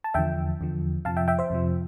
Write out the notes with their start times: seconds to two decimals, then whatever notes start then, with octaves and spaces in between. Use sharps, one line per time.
0.04 A5
0.14 E2 D3 F3 E5 G5
0.61 E2 D3 F3
1.05 F2 C3 F3 F5 A5
1.17 E5 G5
1.28 E5 G5
1.39 C5 E5
1.50 F2 C3 F3